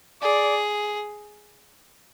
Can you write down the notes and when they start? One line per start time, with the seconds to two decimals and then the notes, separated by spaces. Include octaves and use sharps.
0.22 G#4 D5